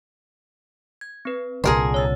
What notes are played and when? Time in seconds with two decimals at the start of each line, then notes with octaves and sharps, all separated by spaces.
1.01 G#6
1.25 C4 B4
1.64 C2 A#2 D3 G#4 A#4 A5 C6
1.94 C#5 E6 A6